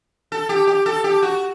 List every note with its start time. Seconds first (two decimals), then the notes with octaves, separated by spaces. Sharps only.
0.32 A4
0.49 G4
0.67 G4
0.86 A4
1.04 G4
1.22 F#4